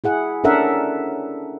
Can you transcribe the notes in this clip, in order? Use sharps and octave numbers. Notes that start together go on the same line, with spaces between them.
E4 G#4 F#5
C#4 D4 A4 A#4 E5 F#5